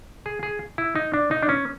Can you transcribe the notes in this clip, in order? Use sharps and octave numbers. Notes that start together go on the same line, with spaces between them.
G#4
G#4
E4
D#4
D4
D#4
D4
C#4